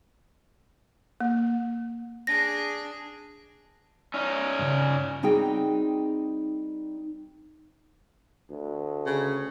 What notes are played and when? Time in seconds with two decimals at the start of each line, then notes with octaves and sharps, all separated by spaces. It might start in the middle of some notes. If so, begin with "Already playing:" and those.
1.20 A#3
2.27 D4 G#4 A#6
4.14 C#4 D#4
4.59 G2 C#3
5.23 G3 C4 D#4 F#4 G#4 G5
8.50 D2
9.06 C#3